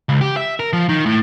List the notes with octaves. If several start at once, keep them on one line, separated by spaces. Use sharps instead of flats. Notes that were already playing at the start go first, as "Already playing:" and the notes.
C#2
G4
E5
A#4
F3
D#3
A2